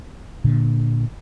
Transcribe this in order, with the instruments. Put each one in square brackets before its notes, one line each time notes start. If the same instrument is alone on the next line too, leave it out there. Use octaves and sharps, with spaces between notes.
[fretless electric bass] A#2 D3